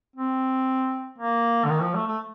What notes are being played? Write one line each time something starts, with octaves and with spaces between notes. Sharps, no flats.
C4
A#3
D3
D#3
F3
A3
A3